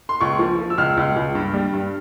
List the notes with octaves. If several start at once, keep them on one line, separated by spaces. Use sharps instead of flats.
C6
C#2 C#6
F3
F3
E6
C#2 F6
C#2
C#2
G2
G3
G2